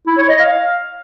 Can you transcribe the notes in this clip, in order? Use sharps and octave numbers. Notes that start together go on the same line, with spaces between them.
E4
C#5
D#5
F5